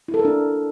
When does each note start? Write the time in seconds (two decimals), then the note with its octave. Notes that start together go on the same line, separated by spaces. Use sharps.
0.08 E4
0.14 A4
0.19 A#4
0.25 D4